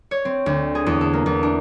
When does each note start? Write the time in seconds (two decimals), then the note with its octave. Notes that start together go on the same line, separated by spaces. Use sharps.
0.11 C#5
0.25 C4
0.46 D2
0.75 G#4
0.86 E2
1.01 A4
1.13 A#3
1.26 E2
1.43 D4